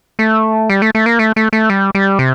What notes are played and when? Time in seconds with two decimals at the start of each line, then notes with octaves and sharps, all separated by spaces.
0.19 A3
0.70 G3
0.82 A3
0.95 A3
1.06 A#3
1.19 A3
1.36 A3
1.53 A3
1.70 G3
1.95 G3
2.19 C3